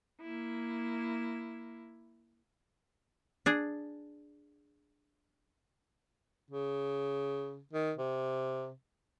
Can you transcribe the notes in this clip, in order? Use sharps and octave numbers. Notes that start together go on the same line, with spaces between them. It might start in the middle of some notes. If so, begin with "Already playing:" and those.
A#3 E4
D4 G#4
C#3
D#3
C3